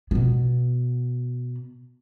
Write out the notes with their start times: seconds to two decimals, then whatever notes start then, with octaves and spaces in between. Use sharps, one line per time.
0.11 B2 B3